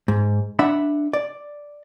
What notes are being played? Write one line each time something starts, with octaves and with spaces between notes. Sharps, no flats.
G#2
D4 E5 F#5 B5
D5